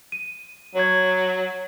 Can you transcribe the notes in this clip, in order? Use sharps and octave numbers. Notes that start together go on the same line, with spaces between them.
D#7
F#3 C#5 C#6 G#6